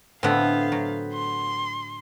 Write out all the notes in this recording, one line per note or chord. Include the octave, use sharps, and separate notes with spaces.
A2 D3 B3 C4 E4 F5
F#3
C6